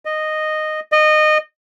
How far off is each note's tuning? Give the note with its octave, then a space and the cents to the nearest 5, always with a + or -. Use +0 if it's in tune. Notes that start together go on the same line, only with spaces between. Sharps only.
D#5 -10
D#5 -20